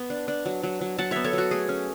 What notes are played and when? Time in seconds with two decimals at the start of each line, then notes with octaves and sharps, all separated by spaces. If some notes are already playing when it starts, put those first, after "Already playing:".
Already playing: B3
0.10 D4
0.28 D4
0.46 F#3
0.63 F#3
0.81 F#3
0.98 F#3 F#5 A5
1.11 B3 C#5 E5
1.24 A4 C#5
1.33 F#3 F#4
1.51 A3 G#4
1.69 C#4